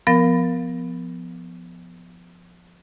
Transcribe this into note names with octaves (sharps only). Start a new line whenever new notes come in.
F3 B3 A#4